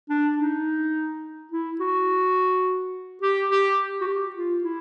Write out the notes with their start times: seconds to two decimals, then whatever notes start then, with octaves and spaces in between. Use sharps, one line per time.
0.09 D4
0.38 D#4
1.52 E4
1.80 F#4
3.22 G4
3.51 G4
4.01 F#4
4.07 G4
4.36 F4
4.64 E4